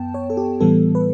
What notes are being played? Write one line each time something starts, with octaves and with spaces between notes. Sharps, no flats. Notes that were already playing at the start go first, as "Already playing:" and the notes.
Already playing: F#2 B3 G5 A5
C#5
A4
G4
A2 E3 G3 B3 A4
B4